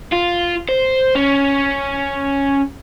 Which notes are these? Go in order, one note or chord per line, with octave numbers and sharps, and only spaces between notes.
F4
C5
C#4